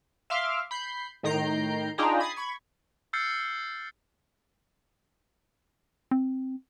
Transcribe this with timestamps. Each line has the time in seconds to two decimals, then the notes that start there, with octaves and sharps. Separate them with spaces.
0.30 E5 F5 C6 D6 F6
0.71 B5 G6 C7
1.23 A2 D#3 A#5 G6 C7 D7
1.98 D4 D#4 F4 G#4 G5 A#5
2.20 B5 D#6 G#6 A6 C7
2.36 B5 C#6 G#6
3.13 E6 F6 G6 A6 C7 C#7
6.11 C4